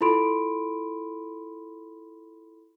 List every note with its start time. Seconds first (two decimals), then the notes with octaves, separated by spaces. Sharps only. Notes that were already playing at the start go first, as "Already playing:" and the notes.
0.01 E4 F4 A4 B5 C6 D7